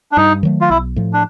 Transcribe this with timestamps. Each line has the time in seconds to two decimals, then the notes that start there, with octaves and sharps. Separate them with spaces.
0.12 D4
0.17 G2 D#4
0.43 D#3 F#3 A3
0.61 F4
0.70 B1 E4
0.96 A2 F3
1.13 D4